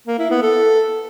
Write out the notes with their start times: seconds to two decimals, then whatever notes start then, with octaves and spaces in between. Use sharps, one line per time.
0.07 A#3
0.19 E4
0.31 B3
0.42 A4